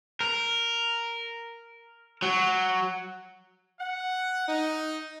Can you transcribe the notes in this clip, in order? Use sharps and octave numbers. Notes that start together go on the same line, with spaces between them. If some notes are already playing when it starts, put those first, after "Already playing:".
A#4
F#3
F#5
D#4